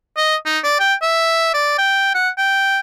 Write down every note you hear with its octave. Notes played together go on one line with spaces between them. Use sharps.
D#5
D#4
D5
G5
E5
D5
G5
F#5
G5